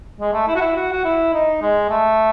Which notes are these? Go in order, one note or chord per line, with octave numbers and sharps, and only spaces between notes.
G#3
A3
E4
F#4
E4
F#4
F#4
E4
D#4
G#3
A3